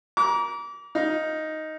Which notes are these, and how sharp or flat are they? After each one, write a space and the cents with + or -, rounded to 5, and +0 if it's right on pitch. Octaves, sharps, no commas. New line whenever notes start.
A#5 +25 D6 -30
D#4 +5 F5 +0